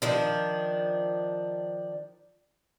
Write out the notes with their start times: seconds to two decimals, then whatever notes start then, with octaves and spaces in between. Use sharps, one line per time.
0.02 D#3 F3 D4